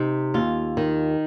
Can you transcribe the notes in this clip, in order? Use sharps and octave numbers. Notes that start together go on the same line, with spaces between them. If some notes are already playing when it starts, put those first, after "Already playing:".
Already playing: C3 D#4
D#2 F4
D#3